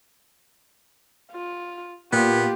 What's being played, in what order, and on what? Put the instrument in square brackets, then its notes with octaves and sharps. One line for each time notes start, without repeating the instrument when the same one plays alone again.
[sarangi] F4
[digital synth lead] A#2 [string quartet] A#3 F4 [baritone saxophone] B3 [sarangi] G4